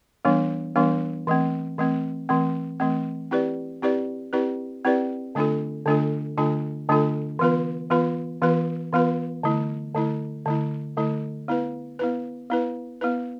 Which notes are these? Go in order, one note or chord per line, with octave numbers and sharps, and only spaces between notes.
E3 G3 B3 D4
E3 G3 B3 D4
E3 A3 C4
E3 A3 C4
E3 A3 C4
E3 A3 C4
C4 E4 G4 B4 D5
C4 E4 G4 B4 D5
C4 E4 G4 B4 D5
C4 E4 G4 B4 D5
D3 A3 D4 F4 A4
D3 A3 D4 F4 A4
D3 A3 D4 F4 A4
D3 A3 D4 F4 A4
E3 B3 F4 B4
E3 B3 F4 B4
E3 B3 F4 B4
E3 B3 F4 B4
D3 A3 E4
D3 A3 E4
D3 A3 E4
D3 A3 E4
B3 E4 B4
B3 E4 B4
B3 E4 B4
B3 E4 B4